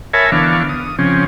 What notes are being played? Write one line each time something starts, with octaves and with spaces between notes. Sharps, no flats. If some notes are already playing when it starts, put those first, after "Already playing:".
A#4 C#5 E5 G#5 A5 B5
D3 E3 B3 D4 F5 C#6
D#6
C#3 F3 C4 C#4